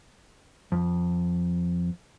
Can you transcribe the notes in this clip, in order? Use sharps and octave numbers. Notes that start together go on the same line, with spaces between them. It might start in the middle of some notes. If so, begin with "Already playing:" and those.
F2